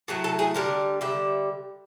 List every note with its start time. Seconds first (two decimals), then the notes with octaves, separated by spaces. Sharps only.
0.08 A2 F#3 A3 B4
0.24 A4
0.39 G#4
0.54 D3 G3 A#4
1.01 D3 G3 E5